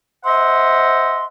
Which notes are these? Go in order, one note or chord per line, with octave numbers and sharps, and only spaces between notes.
C5 D#5 E5 F#5 C6